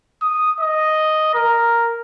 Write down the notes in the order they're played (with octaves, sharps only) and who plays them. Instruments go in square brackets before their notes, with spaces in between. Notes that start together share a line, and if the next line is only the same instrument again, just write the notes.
[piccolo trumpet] D#6
D#5
A#4